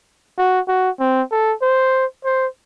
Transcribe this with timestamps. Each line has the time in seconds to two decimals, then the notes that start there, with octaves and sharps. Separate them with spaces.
0.38 F#4
0.68 F#4
1.00 C4
1.32 A4
1.62 C5
2.25 C5